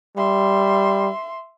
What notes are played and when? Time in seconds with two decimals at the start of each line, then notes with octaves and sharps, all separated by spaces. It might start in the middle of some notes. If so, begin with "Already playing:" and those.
0.17 G3 E5 C6